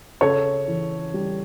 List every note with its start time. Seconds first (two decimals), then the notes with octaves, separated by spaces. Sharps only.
0.21 C#3 A4 C#5
0.68 E3
1.14 G3